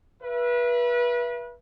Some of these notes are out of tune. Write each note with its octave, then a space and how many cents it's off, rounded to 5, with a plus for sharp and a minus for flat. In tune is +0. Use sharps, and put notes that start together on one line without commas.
B4 -30 E5 +30